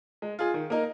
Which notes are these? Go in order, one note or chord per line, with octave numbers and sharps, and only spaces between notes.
G#3
F4 G#4
D#3
A#3 D#4 A#4